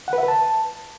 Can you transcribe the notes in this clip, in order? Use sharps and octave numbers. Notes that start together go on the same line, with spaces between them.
F#5
B4
E5
B4
A5